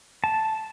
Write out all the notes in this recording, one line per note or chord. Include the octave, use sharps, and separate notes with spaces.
A5